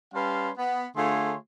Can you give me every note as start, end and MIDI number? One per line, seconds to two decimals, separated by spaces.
0.14 0.50 55
0.14 0.50 61
0.14 0.50 71
0.14 0.50 77
0.14 0.50 81
0.14 0.50 84
0.57 0.84 59
0.96 1.35 50
0.96 1.35 57
0.96 1.35 65
0.96 1.35 68
0.96 1.35 73
0.96 1.35 84